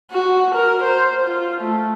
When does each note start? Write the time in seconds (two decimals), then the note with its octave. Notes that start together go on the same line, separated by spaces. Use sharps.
0.11 F#4
0.55 A#4
0.83 C5
1.24 F4
1.61 A3